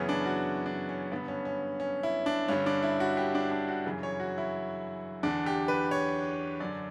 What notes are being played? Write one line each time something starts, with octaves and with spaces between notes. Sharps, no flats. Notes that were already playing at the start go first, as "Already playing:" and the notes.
Already playing: F#2 C#3 E3 B3 C#4
D4
F#4
D4
C#4
G2 D3 B3
C#4
C#4
C#4
E4
D4
G2 D3 C#4
D4
E4
F#4
G4
D4
D4
F#4
F#2 C#3 E3
C#5
F#4
E4
E2 D3 D4
G4
B4
C#5
F#2 D3 D5